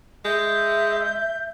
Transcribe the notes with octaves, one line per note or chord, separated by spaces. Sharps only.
G#3 E5 G6